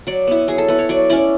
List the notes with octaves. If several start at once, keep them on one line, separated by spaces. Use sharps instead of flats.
F#3 D5
B3 E4
F#3 G#4
A4
B3 E4 B4
C#5
F#3 D5
C#4 E4 D5